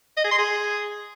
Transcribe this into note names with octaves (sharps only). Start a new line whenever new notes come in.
D#5
G#4
C6
G#4